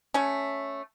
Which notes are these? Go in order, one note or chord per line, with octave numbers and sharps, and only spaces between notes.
A3 C#4